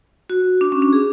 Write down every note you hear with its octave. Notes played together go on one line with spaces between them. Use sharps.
F#4
D4
C#4
D4
G#4